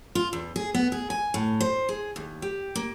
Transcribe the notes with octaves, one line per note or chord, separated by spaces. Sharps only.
F4
E2
G#4
B3
G#4
G#5
A2
C5
G#4
D#2
G4
A#3